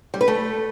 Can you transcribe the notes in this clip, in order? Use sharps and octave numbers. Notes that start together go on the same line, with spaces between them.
G3
B4
A3